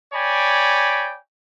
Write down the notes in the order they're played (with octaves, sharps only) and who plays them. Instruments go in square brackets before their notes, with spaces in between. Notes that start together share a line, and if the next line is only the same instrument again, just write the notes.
[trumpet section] C#5 D5 G5 G#5 B5